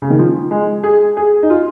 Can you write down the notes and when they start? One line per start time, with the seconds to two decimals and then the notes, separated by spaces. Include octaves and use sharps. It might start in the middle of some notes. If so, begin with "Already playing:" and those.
0.02 C#3
0.10 D#3
0.19 F3
0.51 G#3
0.83 G#4
1.17 G#4
1.43 D#4
1.50 F4